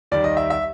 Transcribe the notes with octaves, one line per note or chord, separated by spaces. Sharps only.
D#2 D#3 G3 D5
D#5
E5
E5